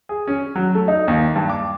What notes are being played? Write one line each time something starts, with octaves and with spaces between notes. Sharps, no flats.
G#4
C#4
F#3
A3
D#4
D#2
G2
D6